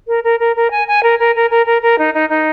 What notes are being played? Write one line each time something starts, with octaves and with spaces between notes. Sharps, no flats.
A#4
A#4
A#4
A#4
G#5
G#5
A#4
A#4
A#4
A#4
A#4
A#4
D#4
D#4
D#4